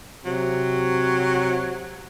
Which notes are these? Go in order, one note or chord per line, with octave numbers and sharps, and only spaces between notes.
C3 F#3